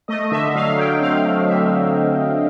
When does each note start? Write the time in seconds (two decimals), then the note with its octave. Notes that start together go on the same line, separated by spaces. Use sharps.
0.08 A3 D#5
0.31 D3 E5
0.54 F#3 F5
0.77 F#3 G5
1.01 C4 F5
1.24 A3
1.48 D3 E5
1.70 F#3